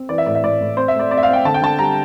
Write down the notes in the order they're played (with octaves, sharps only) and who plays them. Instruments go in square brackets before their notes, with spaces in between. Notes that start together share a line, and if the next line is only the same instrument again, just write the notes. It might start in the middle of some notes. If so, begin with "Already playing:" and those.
Already playing: [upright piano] C4
E3 D5
E5
A2 D5
E5
A2 D5
A2
C4 C5
E5
A3
D5
C4 D5
E5
F5
C4
G5
D3 A5
G5
D3 A5
G3 A#5